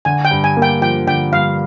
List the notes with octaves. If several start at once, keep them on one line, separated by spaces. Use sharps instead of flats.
D3 G#5
G5
G2
G#5
A#3
G5
F3 G5
D3 G5
G2 F5